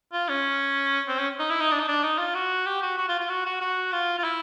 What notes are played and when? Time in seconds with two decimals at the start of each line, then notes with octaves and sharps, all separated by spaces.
0.13 F4
0.29 C#4
1.08 C4
1.19 C#4
1.39 D#4
1.50 E4
1.61 D#4
1.72 D4
1.79 D#4
1.88 D4
2.03 D#4
2.19 F4
2.35 F#4
2.66 G4
2.82 F#4
2.98 F#4
3.09 F4
3.20 F4
3.29 F#4
3.46 F#4
3.61 F#4
3.93 F4
4.19 F4
4.24 E4